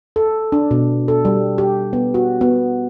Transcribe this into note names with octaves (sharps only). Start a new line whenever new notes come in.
A4
D4
B2
A4
G3
G4
B3
F#4
B3